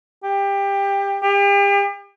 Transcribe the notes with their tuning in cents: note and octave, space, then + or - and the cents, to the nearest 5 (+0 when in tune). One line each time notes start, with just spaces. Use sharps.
G4 +20
G4 +40